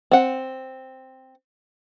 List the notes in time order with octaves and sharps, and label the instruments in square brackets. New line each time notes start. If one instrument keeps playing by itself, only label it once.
[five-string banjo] C4 F#5